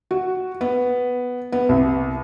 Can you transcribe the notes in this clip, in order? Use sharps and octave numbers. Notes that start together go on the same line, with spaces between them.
F#4
B3
B3
C2